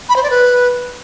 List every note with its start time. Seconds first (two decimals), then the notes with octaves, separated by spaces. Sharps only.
0.09 B5
0.16 C5
0.23 D5
0.30 B4